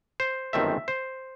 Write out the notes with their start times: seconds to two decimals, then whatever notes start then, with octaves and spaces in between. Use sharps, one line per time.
0.20 C5
0.53 G1 F#2 D#3 A3 C4 E5
0.88 C5